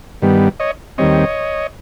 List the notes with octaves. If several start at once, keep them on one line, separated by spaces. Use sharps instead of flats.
G2 D#3 G3 B3
C#5 D#5
D#2 D#3 G3 C4 C#5 D#5